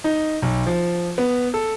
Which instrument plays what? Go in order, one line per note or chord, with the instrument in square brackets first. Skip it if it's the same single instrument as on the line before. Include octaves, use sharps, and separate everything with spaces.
[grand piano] D#4
B1
F3
B3
A4